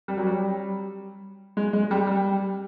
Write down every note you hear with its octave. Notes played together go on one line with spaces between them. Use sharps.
G3
F#3
G3
G#3
G#3
G3
G3